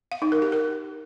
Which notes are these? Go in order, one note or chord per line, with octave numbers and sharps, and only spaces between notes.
F5
D#4
A#4
G4
A#4